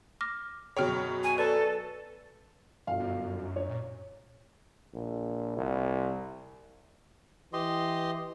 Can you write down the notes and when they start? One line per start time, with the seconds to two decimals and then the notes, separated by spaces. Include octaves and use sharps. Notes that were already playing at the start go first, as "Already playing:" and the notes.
0.21 D6 F6 A#6
0.77 F#2 B2 G#4 C#5 G5 F6
1.24 G#5
1.38 A4 B4 D5
2.87 G1 B2 F5
3.00 F#2
3.56 C#5
3.69 A#2
4.94 A#1
5.57 C2
7.53 E3 G4 D#5 C6